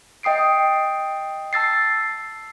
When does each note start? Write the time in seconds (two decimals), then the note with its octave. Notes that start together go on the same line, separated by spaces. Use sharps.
0.23 D#5 G5 D#6 C7 D7
1.53 A5 E6 A6 C7